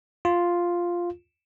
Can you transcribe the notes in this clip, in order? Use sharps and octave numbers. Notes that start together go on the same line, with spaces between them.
F4